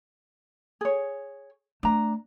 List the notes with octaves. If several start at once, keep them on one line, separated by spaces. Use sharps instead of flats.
G#4 C#5
A3 D4 A#5